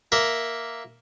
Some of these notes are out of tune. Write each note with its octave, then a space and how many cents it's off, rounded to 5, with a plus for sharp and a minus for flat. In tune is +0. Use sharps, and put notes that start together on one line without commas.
A#3 +0 E5 +0